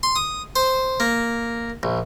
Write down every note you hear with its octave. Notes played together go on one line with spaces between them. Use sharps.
C6
D#6
C5
A#3
A#1